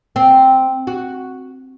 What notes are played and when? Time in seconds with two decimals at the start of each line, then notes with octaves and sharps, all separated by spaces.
0.16 C4
0.87 F#4